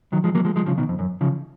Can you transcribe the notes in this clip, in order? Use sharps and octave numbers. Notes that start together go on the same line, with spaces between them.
D#3 F#3
F3 G#3
F#3 A#3
F3 G#3
F3 G#3
C#3 F3
B2 D#3
F2
F#2
C#3 F3